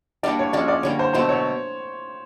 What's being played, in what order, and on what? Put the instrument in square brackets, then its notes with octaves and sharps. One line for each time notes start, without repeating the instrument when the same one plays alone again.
[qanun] G3 A#3 D4 F#4 [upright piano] D5
[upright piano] C#5
[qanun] F3 G#3 C#4 F#4 [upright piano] D5
[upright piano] D5
[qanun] D3 G3 A#3 [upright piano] C#5
[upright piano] C5
[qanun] B2 F#3 A3 [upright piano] C5
[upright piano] C#5